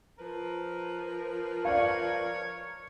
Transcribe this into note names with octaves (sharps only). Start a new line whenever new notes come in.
F3 A#4 B4
C#5 D5 F5